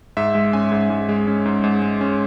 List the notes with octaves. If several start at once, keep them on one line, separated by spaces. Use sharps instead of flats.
G#2 E5
G#3
C#4 G#5
G#2
G#2
G#3
C#4
G#2
G#2
G#3
C#4